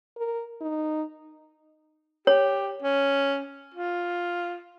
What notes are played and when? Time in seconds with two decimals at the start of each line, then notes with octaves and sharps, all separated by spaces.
0.17 A#4
0.61 D#4
2.27 G4 C#5
2.82 C#4
3.74 F4